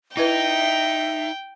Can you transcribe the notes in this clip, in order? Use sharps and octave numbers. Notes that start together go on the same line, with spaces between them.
D#4 E4 B4 E5 G5